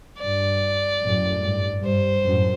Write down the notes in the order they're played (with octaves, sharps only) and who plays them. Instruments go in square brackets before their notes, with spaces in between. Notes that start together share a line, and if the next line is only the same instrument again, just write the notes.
[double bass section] G2 [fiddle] D5
[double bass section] F#2 A2
G2
[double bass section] G2 [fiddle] C5
[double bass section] F#2 A2